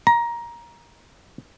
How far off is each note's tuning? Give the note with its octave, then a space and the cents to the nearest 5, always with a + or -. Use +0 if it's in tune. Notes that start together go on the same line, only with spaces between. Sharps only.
A#5 +15